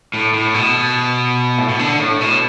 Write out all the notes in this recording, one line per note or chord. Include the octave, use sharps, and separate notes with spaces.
A2
A2
B2
A2
B2
D3
A2
B2